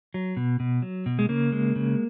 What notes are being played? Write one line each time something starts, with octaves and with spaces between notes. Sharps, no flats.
F#3
B2
B2
F#3
B2
G#3
C#3 A#3
G#3
C#3